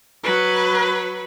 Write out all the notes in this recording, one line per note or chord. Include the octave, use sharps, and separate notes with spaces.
F#3 B4